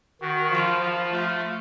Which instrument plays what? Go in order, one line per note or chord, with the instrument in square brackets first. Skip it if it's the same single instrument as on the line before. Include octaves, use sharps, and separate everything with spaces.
[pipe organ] D#3 [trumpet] F#4
[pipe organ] F3 [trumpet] F4
[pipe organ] F3 [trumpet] F4
[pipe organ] A3 [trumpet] F4